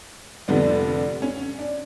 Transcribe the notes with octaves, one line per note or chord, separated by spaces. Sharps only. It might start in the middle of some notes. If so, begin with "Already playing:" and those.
F1 F2 D3 G3 B3 D4
C#4
D4